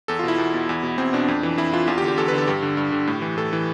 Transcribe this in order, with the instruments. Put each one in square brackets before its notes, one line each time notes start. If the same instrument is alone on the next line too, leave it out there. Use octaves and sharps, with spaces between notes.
[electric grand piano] E2 A4
F4
B2 E4
E2
B2
E2
B2
E2 C4
B2 D4
F2
E3
F2 E4
E3 F4
E2 F4
G4
D3
G4
E2 A4
B4
D3
A4
G2 G4
D3
G2
D3
A2
E3
A2 A4
E3